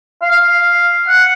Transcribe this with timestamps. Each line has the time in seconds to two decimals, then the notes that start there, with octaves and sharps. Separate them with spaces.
0.22 F5
1.08 F#5